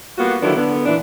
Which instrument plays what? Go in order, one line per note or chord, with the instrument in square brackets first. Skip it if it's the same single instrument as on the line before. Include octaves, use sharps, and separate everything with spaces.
[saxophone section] G3 A#3 B3 F4 F#4
D3 D#3 F#3 B3 D4 E4
D3 B3
A#2 E3 D4